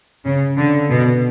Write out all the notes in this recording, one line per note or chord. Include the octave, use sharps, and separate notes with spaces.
C#3
D3
B2